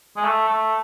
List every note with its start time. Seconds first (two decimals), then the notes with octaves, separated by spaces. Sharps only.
0.16 G#3
0.25 A3
0.49 A3